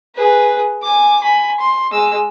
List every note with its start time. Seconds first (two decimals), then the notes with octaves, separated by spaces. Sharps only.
0.16 G#4 B4
0.82 G#5 D6
1.21 G#5 B5
1.60 C6
1.91 G#3 E6